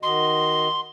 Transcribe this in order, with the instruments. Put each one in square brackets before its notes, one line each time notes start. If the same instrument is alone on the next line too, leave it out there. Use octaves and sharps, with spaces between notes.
[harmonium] D#3 F#4 D#5 [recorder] C6